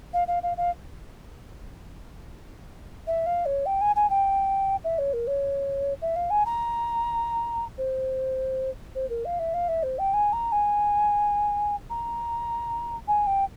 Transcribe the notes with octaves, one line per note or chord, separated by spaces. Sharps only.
F5
F5
F5
F5
E5
F5
C#5
G5
G#5
G#5
G5
E5
C#5
A#4
C#5
E5
F5
G#5
A#5
C5
C5
A#4
F5
E5
F5
E5
C5
G5
G#5
A#5
G#5
A#5
G#5
G5